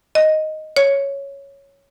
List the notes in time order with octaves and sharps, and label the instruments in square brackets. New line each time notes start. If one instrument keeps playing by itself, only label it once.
[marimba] D#5
C#5